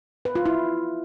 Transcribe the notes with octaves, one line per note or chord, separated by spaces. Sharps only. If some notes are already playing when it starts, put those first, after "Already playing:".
B4
F4
E4